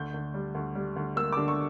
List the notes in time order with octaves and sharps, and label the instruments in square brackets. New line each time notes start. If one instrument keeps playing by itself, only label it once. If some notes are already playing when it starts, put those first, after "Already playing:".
Already playing: [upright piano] D2 G6
D2
G3
D2
G3
D2
A#3 E6
D3 D6
C#6